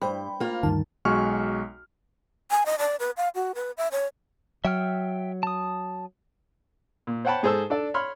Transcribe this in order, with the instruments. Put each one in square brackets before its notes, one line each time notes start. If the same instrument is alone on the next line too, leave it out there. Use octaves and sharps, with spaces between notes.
[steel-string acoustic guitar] G2 [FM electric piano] C5 G5 B5
[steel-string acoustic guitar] A#3 F4
[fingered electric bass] D2 G2 [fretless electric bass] D#3 [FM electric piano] A5
[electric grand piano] B1 G#3 F#4 G#5 C#6 F6
[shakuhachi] G#5
D#5
D5
B4
F5
F#4
B4
E5
C#5
[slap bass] F#3 [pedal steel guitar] E5 G5 F6
[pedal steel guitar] A5 D#6
[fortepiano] A#2
C5 C#5 F#5 G5 A5 B5
G#2 G#4 A4 C5 A5 E6
D4 A4 D5
C#5 B5 C6 F6